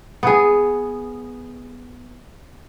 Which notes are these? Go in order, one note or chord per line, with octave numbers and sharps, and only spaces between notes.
B3 G#4